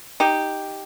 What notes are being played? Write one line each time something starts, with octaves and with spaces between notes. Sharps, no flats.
D#4 G4